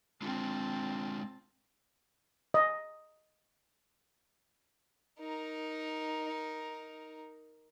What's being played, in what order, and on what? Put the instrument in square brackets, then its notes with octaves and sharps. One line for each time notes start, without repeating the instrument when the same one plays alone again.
[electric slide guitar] G#3 D4 F4 [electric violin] C4 A5
[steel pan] D#5
[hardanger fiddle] D#4 A#4